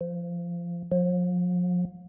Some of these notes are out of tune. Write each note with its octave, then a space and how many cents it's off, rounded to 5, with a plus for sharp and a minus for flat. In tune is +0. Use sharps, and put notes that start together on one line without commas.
F3 -15
F3 +40